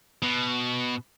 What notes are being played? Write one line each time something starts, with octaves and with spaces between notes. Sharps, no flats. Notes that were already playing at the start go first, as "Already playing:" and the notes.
B2